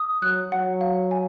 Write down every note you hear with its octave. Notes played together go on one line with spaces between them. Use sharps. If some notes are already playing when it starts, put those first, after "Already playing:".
Already playing: D#6
F#3 F#6
F#3 F#5
F5
G#5